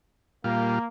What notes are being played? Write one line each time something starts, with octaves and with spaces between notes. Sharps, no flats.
A#2 G3 A#3 F4